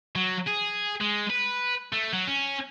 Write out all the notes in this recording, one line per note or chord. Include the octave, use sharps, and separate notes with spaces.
F#3
G#4
G#3
B4
A3
F#3
C#4